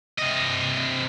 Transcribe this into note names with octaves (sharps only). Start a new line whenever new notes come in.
C3 D#5